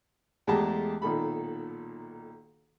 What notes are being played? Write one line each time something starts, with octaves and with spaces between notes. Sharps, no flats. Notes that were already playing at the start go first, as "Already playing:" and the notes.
E2 G#3 A3 G4 A5 A#5
B1 A#2 D#3 A4 B5